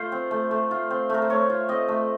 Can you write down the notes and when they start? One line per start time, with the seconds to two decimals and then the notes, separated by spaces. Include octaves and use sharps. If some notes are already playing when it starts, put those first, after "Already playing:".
Already playing: A3 F4 C5
0.12 C4
0.31 A3
0.51 A3
0.71 F4
0.90 C4
1.09 A3 A#4
1.22 C5
1.30 A3 C#5
1.50 F4
1.69 C4 D#5
1.88 A3